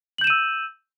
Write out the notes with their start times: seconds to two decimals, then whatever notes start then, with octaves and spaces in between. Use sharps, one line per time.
0.18 F#7
0.21 G6
0.24 E7
0.27 D#7
0.30 E6